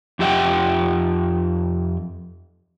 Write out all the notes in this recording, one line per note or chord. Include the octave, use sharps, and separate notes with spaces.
F2 F4 G4 E5 F#5 G5